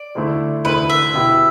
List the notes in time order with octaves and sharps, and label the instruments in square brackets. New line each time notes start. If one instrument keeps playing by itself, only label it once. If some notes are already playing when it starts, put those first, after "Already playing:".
Already playing: [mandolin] D5
[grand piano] D2 D3 A3 E4
[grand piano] D2 D3 A3 E4 [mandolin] B4
[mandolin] E5
[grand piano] B2 B3 E4 G4